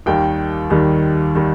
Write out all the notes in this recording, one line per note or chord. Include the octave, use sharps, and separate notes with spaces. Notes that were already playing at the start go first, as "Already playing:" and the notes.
D#2 D#3 G3 G5
D#2 D#3 G3
D#3 G3